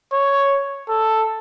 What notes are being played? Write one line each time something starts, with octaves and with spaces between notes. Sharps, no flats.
C#5
A4